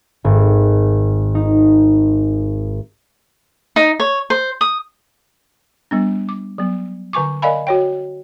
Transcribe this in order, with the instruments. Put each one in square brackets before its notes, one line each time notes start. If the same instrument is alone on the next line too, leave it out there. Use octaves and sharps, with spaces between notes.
[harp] G#1
D#4
[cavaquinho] D#4
C#5
C5
D#6
[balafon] G3 B3 D4
D6
F#3 B3
D3 B4 G#5 C#6 D6
A#4 D5 D#5 F5 G#5 B5
F#4 C#5 G5